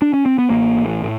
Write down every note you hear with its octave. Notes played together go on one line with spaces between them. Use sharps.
D4
C#4
C4
B3
A1 A#3
A2
A2